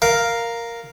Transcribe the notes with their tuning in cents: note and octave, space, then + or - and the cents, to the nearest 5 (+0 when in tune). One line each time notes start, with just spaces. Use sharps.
A#4 +0 F5 +0